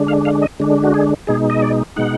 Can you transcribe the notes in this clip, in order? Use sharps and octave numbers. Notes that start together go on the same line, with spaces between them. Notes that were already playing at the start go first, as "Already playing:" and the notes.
Already playing: D3 G#3 D4
F5
F5
D#5
D3 G#3 D4
F#4
G#4
B2 G#3 D#4 G#4
D#5
D5
B2 G#3 D#4 F#5